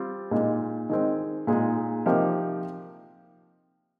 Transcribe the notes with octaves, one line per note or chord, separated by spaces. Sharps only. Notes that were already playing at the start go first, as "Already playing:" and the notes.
Already playing: G3 C4 F4
A#2 G#3 D#4
D#3 G#3 C4
A#2 G#3 D#4 G#4
C3 F3 A#3 D#4 G4